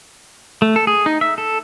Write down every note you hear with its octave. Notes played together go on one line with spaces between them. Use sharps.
A3
A4
G#4
D#4
E5
A4